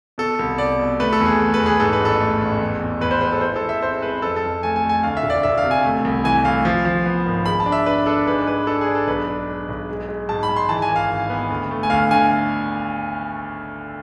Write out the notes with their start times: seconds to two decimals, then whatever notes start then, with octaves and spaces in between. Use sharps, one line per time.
0.18 B2 A4
0.39 C2
0.58 C2 D5
0.79 B2
1.00 A3 B4
1.13 A4
1.20 E2
1.26 G#4
1.39 A3
1.54 B4
1.60 E2
1.66 G#4
1.80 G#2 A4
1.93 B4
2.00 A1 A4
2.21 A3
2.41 A1
2.61 E2
2.82 E2
3.01 E2 B4
3.11 C5
3.21 G#3 C5
3.32 A4
3.41 E4 C5
3.56 A4
3.62 G#3
3.69 E5
3.82 C4 C5
4.02 G#3 B4
4.22 F2 A4
4.36 A4
4.42 F2
4.63 A3 G#5
4.76 G#5
4.84 A3
4.89 G#5
5.03 D2 F5
5.17 E5
5.23 E1
5.30 D5
5.43 E1 E5
5.58 F5
5.63 C3
5.71 G#5
5.85 A3
6.05 C2
6.24 E3 G#5
6.45 A3 F5
6.65 F3
6.85 F3
7.06 B3
7.26 G#1
7.46 G#3 B5
7.60 A5
7.66 D4
7.72 E5
7.86 D4 B4
8.06 D4 A4
8.27 G#2 B4
8.46 G#3 B4
8.67 D4 A4
8.81 G#4
8.87 D4
8.95 A4
9.07 B1 B4
9.28 D4
9.48 G#3
9.68 B1
9.89 G#3
10.09 G#3
10.29 G#2 A5
10.43 B5
10.49 G#2
10.56 C6
10.69 E3 A5
10.82 G#5
10.89 G#1
10.96 F5
11.10 G#1
11.30 B3
11.50 D2
11.71 A3
11.83 G#5
11.90 D2 F5
12.11 D3 G#5